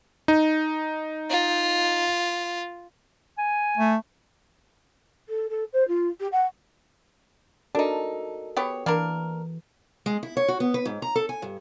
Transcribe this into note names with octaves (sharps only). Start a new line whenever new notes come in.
D#4
F4
G#5
A3
A4
A4
C5
F4
G4
F#5
D4 D#4 F#4 A4 A#4
B3 G4 C#5
E3 A#3 D4 A#4
G#3
E4
C#5
F#4
B3
B4
G#2
A#5
A4
G#5
G2